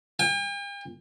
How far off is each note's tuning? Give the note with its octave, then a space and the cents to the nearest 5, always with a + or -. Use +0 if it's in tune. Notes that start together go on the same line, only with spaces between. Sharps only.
G5 +45